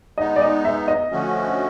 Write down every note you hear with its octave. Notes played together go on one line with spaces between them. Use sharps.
G#3 B3 D#4 D#5
D5
D#5
E5
D#5
D3 F3 A3 C#4 F#4